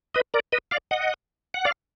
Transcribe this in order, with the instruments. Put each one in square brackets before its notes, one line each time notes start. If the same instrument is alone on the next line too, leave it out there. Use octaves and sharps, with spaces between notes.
[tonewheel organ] B4 D#5
A#4 D5
B4 D#5
D5 F5
D#5 F#5
F#5
D5 F5